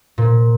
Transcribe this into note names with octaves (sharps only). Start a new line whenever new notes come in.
A#2